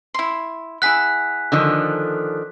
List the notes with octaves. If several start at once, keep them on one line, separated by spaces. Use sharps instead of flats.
E4 C6
E4 G#4 F#5 F#6 B6
D3 D#3 F3